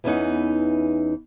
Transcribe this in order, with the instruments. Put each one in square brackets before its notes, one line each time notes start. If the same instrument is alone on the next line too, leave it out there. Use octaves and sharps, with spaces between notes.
[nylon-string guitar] E2 E3 B3 C#4 D#4 F#5